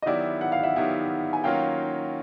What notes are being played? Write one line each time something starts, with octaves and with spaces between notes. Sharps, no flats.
D#5
D#3 F#3 B3 E4 G4 D5 E5
F#5
F5
E5 F#5
D#3 F#3 B3 E4 G4
G#5
D#3 F#3 A#3 C#4 F4 F5 G5